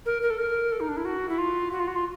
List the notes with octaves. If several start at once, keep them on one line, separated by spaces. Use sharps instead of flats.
A#4
A#4
A4
A#4
A4
D#4
D4
E4
F#4
E4
F4
F#4
F4
F#4
F4